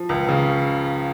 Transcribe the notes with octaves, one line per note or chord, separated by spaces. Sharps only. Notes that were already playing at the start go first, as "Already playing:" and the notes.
Already playing: F3
C#2
C#3